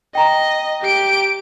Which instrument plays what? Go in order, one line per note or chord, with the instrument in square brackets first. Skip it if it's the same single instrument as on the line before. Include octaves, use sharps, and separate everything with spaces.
[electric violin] D#5 [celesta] G5 A#5
[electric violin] G4 D7